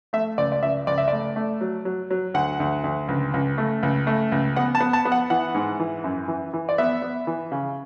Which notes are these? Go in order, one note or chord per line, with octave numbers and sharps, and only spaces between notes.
A3 E5
C#2 D5
D5
C#2 E5
C#2 D5
E5
A3 D5
A3
F#3
F#3
F#3
D2 F#5
D2
D2
C#2
C#2
A3
C#2
A3
C#2
B3 F#5
A5
B3
A5
B3
F#5
E3 F#5
G#2
E3
F#2
E3
E3
D5
B3 E5
B3
E3
C#3